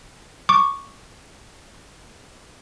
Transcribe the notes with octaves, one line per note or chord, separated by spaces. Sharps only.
C#6 D6